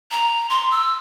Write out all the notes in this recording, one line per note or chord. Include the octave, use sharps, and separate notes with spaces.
A#5
C6
E6